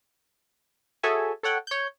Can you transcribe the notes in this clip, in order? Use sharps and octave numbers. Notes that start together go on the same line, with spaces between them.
F#4 G#4 A4 C#5 E5 G#5
A4 C#5 F#5 G5
C#5 G6